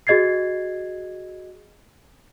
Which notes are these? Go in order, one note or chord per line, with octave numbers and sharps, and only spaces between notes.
F#4 G#4 D#5 G#6 A6 C7